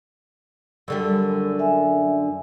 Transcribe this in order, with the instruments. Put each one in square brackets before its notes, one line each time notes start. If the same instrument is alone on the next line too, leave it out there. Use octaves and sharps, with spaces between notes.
[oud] F#2 D3 G3 [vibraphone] E6
[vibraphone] E5 G#5